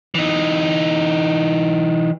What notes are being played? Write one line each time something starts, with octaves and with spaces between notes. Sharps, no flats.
E3 D#4